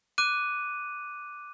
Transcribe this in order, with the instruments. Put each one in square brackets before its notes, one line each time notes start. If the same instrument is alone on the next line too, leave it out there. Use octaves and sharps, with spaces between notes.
[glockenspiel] D6 F#6 D#7